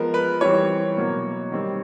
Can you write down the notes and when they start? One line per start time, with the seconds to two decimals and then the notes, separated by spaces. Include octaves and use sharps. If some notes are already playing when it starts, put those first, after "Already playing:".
Already playing: F3 G#3 B3 A#4
0.14 B4
0.41 E3 G3 C4 C#5
0.97 B2 F#3 A#3
1.52 D#3 G3 C4